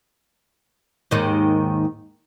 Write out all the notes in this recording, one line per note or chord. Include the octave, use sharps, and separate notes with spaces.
D#2 G#2 D#3